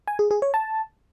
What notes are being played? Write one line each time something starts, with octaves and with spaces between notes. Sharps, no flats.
G#5
G#4
G#4
C#5
A5